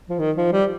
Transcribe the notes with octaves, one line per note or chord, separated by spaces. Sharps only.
F3
D#3
F3
G3